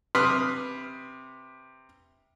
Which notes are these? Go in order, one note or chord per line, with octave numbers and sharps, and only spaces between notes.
C3 B4 C6 D#6 F6